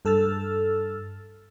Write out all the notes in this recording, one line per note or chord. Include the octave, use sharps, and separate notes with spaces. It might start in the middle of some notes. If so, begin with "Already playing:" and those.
G2 A4 E6 F6 A6